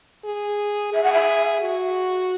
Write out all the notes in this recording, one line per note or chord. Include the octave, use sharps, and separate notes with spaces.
G#4
G#4 E5
F#5
E5
F#4